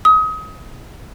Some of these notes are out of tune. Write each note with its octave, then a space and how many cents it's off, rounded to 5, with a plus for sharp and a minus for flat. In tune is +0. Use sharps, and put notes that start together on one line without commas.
D#6 +30